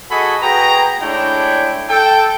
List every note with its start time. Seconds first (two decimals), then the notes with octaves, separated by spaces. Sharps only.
0.11 F#4 G#4 A4 D#5 G#5 B5
0.42 F#4 G#4 B4 G5 A#5
1.02 G#3 A3 D4 E4 C#5 G5
1.90 A4 G5